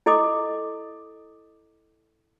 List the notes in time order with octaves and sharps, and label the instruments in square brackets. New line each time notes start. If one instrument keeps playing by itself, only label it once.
[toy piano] E4 A4 D#5 D6 D#6